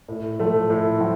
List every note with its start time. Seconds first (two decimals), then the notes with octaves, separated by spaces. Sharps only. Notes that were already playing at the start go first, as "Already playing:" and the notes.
0.08 A2
0.40 F3 A3
0.70 A2
1.01 F3